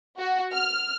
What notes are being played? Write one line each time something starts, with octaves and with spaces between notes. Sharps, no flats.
F#4
F6